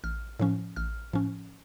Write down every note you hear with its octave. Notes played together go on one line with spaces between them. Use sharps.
A1 F6
A2 F3 C#4
A1 F6
A2 F3 C#4